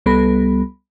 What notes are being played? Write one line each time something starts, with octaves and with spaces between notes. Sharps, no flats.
C2 G3 B3 A4 B5